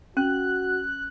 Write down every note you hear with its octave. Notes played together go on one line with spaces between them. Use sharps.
C#4 F#4 F#6